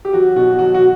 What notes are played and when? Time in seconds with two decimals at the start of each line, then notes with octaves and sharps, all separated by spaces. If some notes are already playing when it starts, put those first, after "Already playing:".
0.05 G4
0.13 F#3 F#4
0.36 B2 F#4
0.59 F#3 F#4
0.74 F#4